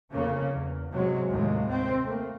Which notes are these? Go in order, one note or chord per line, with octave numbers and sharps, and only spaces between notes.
F2 C#3 A#3 C#4
E2
G#2 C3 F#3 G#3
D#2 A2 C3 G#3
C4
A3 A#3